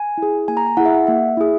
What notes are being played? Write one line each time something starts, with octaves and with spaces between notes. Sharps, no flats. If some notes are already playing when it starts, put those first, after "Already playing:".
Already playing: G#5
E4 G#4
A#3 G#5
A#5
G#5
E4 G#4 F#5
E5
F#5
A#3 E5
E4 G#4